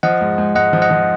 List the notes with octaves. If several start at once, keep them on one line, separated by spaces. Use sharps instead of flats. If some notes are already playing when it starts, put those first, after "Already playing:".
F3 D#5 F#5
G#2
G#2
G#2 D#5 F#5
F3
D#5 F#5
F3